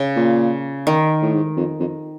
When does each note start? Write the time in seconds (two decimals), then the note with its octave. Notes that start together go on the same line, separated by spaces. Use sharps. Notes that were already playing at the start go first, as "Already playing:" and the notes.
Already playing: C#3
0.16 A#2
0.87 D#3
1.22 A2
1.34 G#2
1.57 F2
1.80 F2